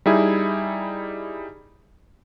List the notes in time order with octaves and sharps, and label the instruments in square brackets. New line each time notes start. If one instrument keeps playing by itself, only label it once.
[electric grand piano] G3 D#4 E4 G#4